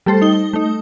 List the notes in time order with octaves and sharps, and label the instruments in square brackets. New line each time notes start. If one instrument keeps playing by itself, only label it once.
[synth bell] G3 A3 A4 C5
D#4 G7
A3 D#4